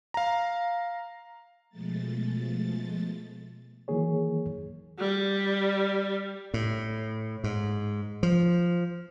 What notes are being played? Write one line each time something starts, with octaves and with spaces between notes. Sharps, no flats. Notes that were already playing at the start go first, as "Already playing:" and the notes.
F5 A#5
B2 F3 G#3 A3 A6
D#3 E3 F#3 A#3 G#4 C#5
G3
A2
G#2
F3